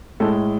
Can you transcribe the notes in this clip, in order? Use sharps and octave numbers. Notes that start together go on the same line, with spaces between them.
A2 G#3 A4